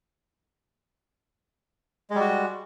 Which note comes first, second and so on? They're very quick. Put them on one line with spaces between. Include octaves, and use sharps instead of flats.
G#3 G3 F#4